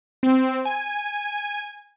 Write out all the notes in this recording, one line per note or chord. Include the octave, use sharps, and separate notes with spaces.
C4
G#5